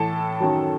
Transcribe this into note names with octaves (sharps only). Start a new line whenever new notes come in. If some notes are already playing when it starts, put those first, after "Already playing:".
Already playing: A2 E3 A4 A5
F#2 D#3 F#3